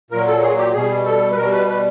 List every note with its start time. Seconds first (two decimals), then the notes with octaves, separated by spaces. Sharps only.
0.11 A#2 F#3 A#4
0.27 A4
0.42 G#4
0.58 G4
0.73 B2 G3 G#4
1.06 A4
1.31 B4
1.36 B2 G3 A#4
1.52 B4
1.68 B4